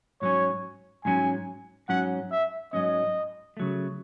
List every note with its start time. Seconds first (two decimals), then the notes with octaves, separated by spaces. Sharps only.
0.21 G#2 F#3 C#4 C#5
1.05 G#2 F#3 C#4 G#5
1.89 G#2 F#3 C#4 F#5
2.31 E5
2.73 G#2 F#3 C#4 D#5
3.57 C#3 F#3 A3